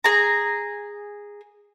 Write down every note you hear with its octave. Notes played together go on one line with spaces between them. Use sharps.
G#4 A#5